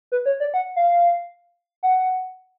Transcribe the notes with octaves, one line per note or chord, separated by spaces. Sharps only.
B4
C#5
D5
F#5
F5
F#5